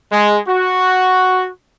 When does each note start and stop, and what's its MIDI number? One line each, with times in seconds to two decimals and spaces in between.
0.12 0.38 56
0.48 1.48 66